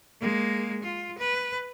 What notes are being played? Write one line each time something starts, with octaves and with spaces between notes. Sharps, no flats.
G#3 A#3
F4
B4